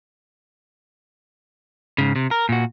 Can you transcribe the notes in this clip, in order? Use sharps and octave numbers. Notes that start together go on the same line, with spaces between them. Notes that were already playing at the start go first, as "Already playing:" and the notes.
G#2 C#3
C3
A#4
A#2 F#4